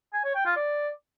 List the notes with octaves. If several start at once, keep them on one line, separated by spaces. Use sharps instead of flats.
G#5
C#5
G5
F4
D5